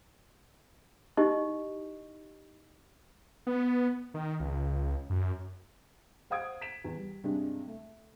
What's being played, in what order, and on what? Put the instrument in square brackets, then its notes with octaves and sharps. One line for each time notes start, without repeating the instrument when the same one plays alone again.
[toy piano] D#4 E4 G4 D#5 C#6
[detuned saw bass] B3
D#3
C#2
F#2
[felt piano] C5 F5 F#5 D#6 G#6 D7
B6 D7 E7
E2
G3
G2 C3 G3 G#3 D4 G4
A3